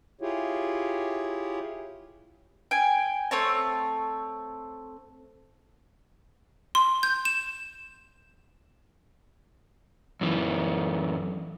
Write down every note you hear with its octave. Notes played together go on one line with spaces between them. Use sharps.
E4 F4 G4 G#4 C#5
G5 G#5
A3 C4 C#5 A5
C6
G6
E7
F#2 E3